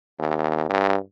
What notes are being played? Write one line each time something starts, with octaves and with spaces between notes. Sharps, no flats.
D#2
G2